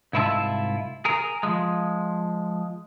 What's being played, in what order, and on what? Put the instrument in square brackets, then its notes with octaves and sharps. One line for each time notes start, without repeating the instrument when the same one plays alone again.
[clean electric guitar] C2 G#2 E4 F4 E5 A5
G#4 A#4
F3 G#3